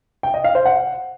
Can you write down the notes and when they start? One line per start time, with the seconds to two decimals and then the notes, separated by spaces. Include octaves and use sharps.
0.23 G5
0.34 D#5
0.44 F5
0.55 C5
0.65 F#5